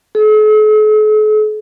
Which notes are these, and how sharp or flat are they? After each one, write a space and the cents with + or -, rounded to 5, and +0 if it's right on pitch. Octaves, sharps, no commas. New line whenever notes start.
A4 -45